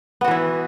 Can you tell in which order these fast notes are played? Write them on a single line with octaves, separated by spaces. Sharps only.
B3 F#4 E3 E4